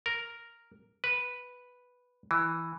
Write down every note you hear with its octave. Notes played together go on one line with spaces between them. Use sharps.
A#4
B4
E3